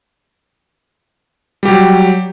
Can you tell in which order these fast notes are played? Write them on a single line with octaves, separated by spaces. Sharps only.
G3 G4 F#3